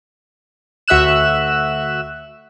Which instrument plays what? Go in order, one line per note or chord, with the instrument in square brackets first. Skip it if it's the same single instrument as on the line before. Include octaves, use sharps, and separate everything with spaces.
[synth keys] D2 F#4 E5 E6 F#6 E7